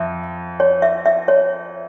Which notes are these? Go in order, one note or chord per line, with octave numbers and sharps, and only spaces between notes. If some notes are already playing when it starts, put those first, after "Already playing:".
Already playing: F2 E5
C#5
E5
E5
C#5